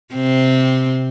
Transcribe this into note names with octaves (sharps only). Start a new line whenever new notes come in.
C3 C4